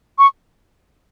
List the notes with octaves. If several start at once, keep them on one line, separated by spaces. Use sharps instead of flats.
C#6